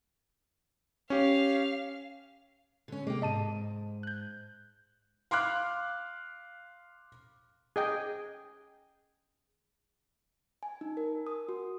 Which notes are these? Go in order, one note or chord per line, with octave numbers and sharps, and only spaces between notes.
C#4 G4 F5
D3 C#4
C3 G#3 A#3 G5
G#2 D#5 A5 D#7
F#6 G6
F5 C6 D6 F6 F#6
G#4 D#5 G5
G#5
D#4
A#4
D#6
F#4